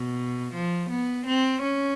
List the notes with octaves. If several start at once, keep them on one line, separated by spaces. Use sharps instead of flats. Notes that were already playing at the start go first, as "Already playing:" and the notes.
Already playing: B2
F3
B3
C4
C#4